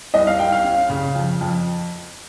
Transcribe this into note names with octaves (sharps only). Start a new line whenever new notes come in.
C2 D#5
F5
C2 G5
F5
C#4
C#3
F2
F2